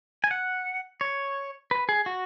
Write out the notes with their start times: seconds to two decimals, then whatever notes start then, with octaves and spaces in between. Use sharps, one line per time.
0.24 G#5
0.31 F#5
1.01 C#5
1.71 B4
1.89 G#4
2.06 F#4